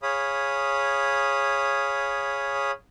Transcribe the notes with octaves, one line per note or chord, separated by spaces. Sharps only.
G#4 C#5 F5 B5 D#6